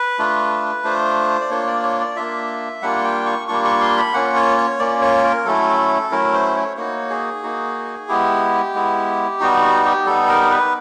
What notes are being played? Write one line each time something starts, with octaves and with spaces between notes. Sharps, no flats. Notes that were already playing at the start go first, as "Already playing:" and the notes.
Already playing: B4
A3 D4 F4
A3 D4 F4 C5
D5
A#3 D4 F4 C#5
D5
C#5
D5
A#3 D4 F4 E5
G3 A#3 D4 F4 F#5
G5
C#6
G3 A#3 D4 F4 C#6
C#6
C6
B5
A#3 C#4 F4 F#5
C#5
C#5
A#3 C#4 F4 D5
C#5
A#4
F#3 A3 C#4 E4 A4
F#3 A3 C#4 E4 A#4
C5
C#5
A#3 D#4 F#4 C#5
G#4
A#3 D#4 F#4
G#3 B3 E4 G4
G#3 B3 E4
G3 B3 D#4 F#4
F#4
G4
G3 B3 D#4 A4
A#4
B4